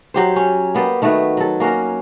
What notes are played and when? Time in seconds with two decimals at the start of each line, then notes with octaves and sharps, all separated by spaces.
0.14 F#3 G4 C5
0.36 C#4
0.75 A#3 B3 D5 G5
1.02 D#3 A3 B3 F#4
1.37 F#3 A4
1.60 A#3 C#4 F#4 A#4